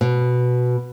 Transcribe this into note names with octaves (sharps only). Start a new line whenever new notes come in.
B2